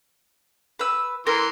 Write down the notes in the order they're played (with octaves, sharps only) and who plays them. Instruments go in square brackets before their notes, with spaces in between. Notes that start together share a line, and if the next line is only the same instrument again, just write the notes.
[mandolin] B4 E6
[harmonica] E3 C6 [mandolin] A#4